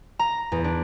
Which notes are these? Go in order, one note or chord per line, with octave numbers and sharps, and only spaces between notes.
A#5
E2
D4